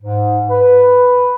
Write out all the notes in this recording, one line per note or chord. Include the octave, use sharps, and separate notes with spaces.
G#2
B4